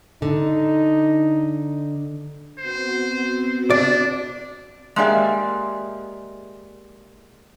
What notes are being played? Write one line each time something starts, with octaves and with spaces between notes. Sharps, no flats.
D3 D#4
B3 C4 F#4 C5
D4 D5
G#3 A#3 G4 G#4 D5 E5